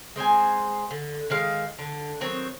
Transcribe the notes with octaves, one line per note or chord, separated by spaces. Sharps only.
G#3 C4 C5 G#5
D3
D#3 G#3 F5
D3
D#3 F#3 C4 C#5